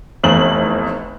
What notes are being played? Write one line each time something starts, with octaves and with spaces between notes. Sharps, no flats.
F1 E2 F#7